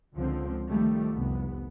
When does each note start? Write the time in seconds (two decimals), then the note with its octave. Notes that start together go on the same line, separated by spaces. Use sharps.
0.16 C#2 D3 F3 C4
0.68 D#3 F3 G3 A3
1.13 F1 C2 B3